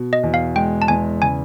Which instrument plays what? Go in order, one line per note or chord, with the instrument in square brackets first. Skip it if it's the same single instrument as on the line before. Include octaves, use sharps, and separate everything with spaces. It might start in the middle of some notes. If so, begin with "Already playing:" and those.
Already playing: [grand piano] B2
[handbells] D#5
[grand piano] E2
[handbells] F5
[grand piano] G#3 [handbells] G5
[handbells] A5
[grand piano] E2 [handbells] G#5
[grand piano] C#3 [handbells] G#5